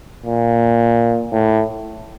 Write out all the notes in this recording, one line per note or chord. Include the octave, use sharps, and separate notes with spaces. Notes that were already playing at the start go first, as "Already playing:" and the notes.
A#2
A2